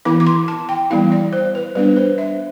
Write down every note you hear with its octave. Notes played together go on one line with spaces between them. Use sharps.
E3 B3 E4 D6
D6
C6
A5
G5
E3 G3 B3 E4 F5
D5
C5
B4
G3 B3 D4 B4
C5
E5